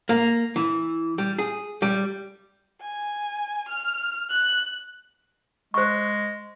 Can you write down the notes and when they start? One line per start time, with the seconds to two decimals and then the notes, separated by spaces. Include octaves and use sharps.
0.09 A#3
0.56 E3
1.18 G3
1.39 G#4
1.82 G3
2.81 G#5
3.68 F6
4.30 F#6
5.74 G#3 C5 C#6